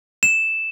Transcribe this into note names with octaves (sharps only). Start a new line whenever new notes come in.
E7